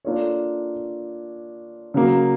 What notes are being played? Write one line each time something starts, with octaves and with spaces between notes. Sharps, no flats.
A#3 D4 F4 A4 C#5
C#3 F#3 A#3